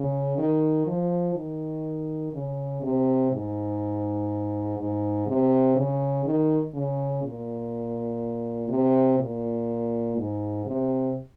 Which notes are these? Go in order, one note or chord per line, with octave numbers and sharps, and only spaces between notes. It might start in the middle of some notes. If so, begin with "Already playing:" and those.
Already playing: C#3
D#3
F3
D#3
C#3
C3
G#2
G#2
C3
C#3
D#3
C#3
A#2
C3
A#2
G#2
C3